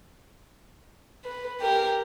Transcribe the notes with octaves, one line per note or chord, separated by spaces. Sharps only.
B4
G4 A#4